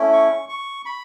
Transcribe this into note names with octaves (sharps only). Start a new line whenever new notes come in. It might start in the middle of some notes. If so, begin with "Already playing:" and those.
Already playing: A3 C#4 E4
C#6
C#6
B5